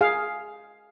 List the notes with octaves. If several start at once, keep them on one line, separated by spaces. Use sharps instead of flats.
G#4 F5